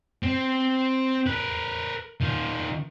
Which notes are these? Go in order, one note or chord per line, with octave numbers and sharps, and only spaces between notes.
C4
A#4 B4
D#3 F4